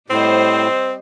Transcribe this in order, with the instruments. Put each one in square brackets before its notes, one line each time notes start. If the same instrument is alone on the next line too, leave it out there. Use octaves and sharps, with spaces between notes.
[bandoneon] A2 [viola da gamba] G3 C5 D#5 [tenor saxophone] C4